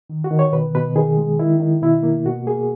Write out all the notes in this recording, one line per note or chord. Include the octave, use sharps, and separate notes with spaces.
D#3
F#4
D#3
C#5
B2 B4
B2 B4
D#3 G#4
G#3
D#3 E4
D#3
B2 E4
A#3
B2 F#4
A#3 G#4